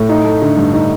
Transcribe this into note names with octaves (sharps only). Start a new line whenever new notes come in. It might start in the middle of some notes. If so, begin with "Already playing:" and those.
Already playing: A2
D#4
A3
D3
G2
D#4